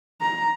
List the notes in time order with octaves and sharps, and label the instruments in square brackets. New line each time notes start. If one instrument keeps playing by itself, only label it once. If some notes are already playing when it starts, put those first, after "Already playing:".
[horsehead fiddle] A#5